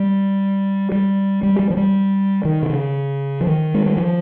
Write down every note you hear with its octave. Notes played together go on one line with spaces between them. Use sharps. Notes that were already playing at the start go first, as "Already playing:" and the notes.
Already playing: G3
G3
G3
G3
F3
G3
D#3
C3
C#3
F3
D#3
G#3
G3
F3